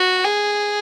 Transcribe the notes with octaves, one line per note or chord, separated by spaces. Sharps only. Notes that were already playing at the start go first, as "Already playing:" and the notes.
Already playing: F#4
G#4